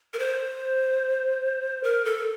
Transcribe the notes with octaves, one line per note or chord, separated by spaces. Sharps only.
A#4
C5
A#4
A4